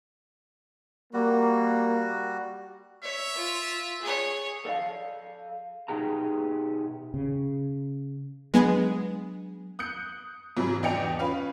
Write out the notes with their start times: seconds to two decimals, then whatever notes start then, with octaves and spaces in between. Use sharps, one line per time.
1.13 G3 A#3 F#4
3.03 C#5 E5
3.37 F4
4.02 G#4 C#5
4.65 A4 D5 D#5 F5
5.88 B2 D#4 G4 G#4 A#5
7.14 C#3
8.54 F#3 G#3 B3 D4 G#4
9.79 D#6 F#6 G6 C#7
10.57 G#2 C3 E3 F#3 G3
10.83 E2 D4 D#5 G5 C#7 F7
11.19 C#4 F4 B4